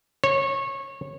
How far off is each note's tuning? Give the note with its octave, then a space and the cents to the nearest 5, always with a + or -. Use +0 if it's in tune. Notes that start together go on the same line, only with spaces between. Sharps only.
C#5 -20